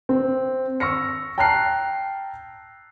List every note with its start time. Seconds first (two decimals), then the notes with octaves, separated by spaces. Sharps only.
0.09 C4
0.80 C#6 E6 F6 A#6 C#7
1.38 G5 A5 A#5 F6 F#6 C7